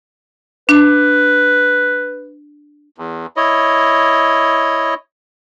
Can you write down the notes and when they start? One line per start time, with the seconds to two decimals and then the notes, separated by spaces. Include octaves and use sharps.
0.69 D4 B4
2.98 E2
3.37 E4 C#5 D#5